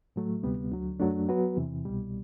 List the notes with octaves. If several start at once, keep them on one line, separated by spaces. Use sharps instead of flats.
A2 F#3 A3
D2 C3 G3 B3
D2 D3 F#3
F#2 F#3 A3 D4
F#3 B3 F#4 B4
E2 C3 E3
C2 B2 G3